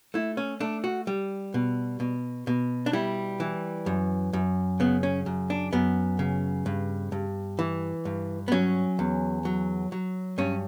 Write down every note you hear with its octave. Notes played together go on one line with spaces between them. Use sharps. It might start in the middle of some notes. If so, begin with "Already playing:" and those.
A3 E4
C#4
A3 D4
F#4
G3
B2
B2
B2
D4
G3 E4
E3
F#2
F#2
C#3 B3
C#4
F#2
D4
F#2 B3
C#3
G2
G2
E3
G2
B3
F#3 C#4
E2
F#3
F#3
G2 C#4